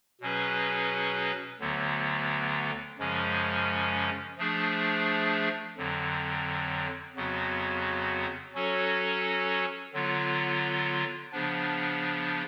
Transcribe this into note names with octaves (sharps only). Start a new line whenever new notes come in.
B2 F#3 C#4 G#4 B4
D2 D3 F#3 B3
F#2 C#3 F3 G#3 C#4
F3 A3 D4 G#4
F2 D3 F#3
F2 C#3 F#3 B3 F#4
F#3 C#4 F#4 A4 C#5
D3 F#3 B3 F4
C#3 F3 B3 D4